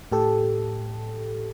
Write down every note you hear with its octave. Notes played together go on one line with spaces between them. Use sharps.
A2 G4 A4